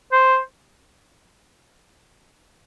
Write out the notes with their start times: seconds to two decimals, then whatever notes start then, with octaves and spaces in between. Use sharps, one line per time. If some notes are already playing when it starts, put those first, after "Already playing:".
0.12 C5